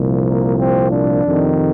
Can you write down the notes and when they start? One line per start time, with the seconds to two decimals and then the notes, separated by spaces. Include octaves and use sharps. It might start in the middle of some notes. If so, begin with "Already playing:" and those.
Already playing: C2 A#2 F3
0.24 A#3
0.58 C4
0.91 D4
1.25 F2 C3 D#3